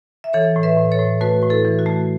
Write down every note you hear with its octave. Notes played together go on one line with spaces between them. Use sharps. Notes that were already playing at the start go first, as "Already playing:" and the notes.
E5
E3 A4 C#5
A2
B4 E5
A2
A4 C#5
A2
A3 F#4 B4
A2 B4
E4 A4
E3
F#4
A3